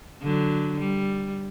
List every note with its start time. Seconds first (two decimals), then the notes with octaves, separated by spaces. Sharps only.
0.22 D3 F#3
0.79 G3